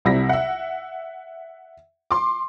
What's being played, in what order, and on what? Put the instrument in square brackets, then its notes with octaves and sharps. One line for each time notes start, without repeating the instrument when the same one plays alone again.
[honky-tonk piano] C2 C3 G3 E4 A#6 B6
E5 F#5
C6 D6